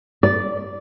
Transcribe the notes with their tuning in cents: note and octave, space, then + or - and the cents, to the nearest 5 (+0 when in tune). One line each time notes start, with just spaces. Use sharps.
D5 -10